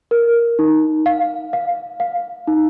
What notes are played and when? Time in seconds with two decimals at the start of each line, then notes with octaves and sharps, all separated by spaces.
0.11 A#4
0.59 D#4
1.06 F5
1.53 F5
2.00 F5
2.47 D#4